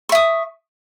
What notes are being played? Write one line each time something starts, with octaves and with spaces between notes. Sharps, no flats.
E5 C#6 D#6